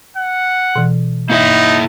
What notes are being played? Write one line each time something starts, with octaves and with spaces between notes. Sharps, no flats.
F#5
B2 E3
A#3 D#4 E4 E5